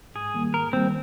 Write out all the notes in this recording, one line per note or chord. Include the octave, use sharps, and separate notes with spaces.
G#2 G#4
D#3 G3 A#3
G#2 A#4
D#3 G3 A#3 C4